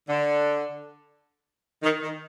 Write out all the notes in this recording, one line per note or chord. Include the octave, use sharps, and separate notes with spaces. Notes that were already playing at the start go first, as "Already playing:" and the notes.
D3
D#3
D#3